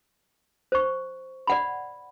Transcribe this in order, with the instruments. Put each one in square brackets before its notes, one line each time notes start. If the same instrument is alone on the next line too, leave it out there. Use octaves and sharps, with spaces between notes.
[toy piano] C5 C#6
D5 F#5 B5